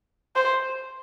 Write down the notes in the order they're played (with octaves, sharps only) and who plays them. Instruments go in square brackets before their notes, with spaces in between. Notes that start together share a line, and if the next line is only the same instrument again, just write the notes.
[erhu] C5